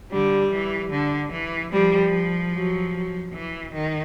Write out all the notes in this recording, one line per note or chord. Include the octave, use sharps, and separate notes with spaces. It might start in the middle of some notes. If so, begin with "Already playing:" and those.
D3 G3
E3
D3
E3
F3 G3
F#3
E3
D#3